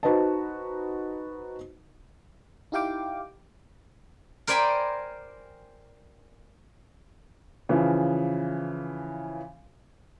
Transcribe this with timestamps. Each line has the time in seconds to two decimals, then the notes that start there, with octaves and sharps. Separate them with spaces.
0.03 D#4 F#4 B4 C5 D#5 A5
2.72 D#4 E4 G4 F5 G5 D6
4.47 A#4 C5 D5 G5 G#5 B5
7.69 C#3 E3 F3